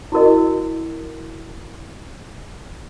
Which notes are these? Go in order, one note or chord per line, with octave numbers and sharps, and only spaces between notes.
E4 F#4 A#4 D#5